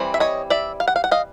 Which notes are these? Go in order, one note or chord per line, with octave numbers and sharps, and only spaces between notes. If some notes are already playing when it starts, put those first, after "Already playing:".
Already playing: E3 G3 C4
E5
C#5 D#5
D5 E5
F5
F#5
F5
F#5
D#5 F5